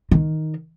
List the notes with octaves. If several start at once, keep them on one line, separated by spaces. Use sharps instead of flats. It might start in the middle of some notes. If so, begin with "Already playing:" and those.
D#3